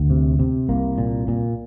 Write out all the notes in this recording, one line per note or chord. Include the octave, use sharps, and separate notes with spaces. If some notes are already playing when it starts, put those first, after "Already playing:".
Already playing: D2
C3
C3
C2 A#3
A#2
A#2